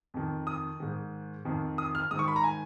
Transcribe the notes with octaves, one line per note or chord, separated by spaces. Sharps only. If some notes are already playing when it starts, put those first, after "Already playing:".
F2 D#3
D#6
G#2 D#3
F2 D#3
D#6
F6
G#2 D#3 D#6
C#6
B5
A#5
G#5